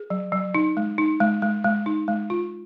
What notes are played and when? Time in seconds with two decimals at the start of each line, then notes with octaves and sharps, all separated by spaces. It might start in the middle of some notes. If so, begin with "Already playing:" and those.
Already playing: G#4
0.10 F#3
0.32 F#3
0.55 D#4
0.77 G#3
0.98 D#4
1.20 G#3
1.42 G#3
1.64 G#3
1.86 D#4
2.08 G#3
2.30 F4